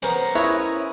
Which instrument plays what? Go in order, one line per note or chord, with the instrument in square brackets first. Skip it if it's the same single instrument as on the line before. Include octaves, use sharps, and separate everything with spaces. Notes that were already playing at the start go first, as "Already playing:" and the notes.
[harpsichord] B3 C5 [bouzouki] C#4 A#4
[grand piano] E4 [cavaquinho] B4 C#5 D#5